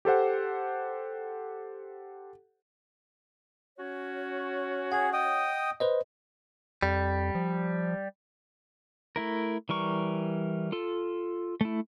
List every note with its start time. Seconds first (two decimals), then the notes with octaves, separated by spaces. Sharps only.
0.05 G4 A4 C5 F#5
3.79 C#4 F#4 C#5
4.92 G#4 F#5
5.13 D#5 G5 D#6
5.80 B4 C5 D#5
6.83 F2 G3
7.35 F3
9.16 A3 E4 A#4
9.69 E3 G3 A#4 C#6
10.72 F4 A4
11.61 A3 E4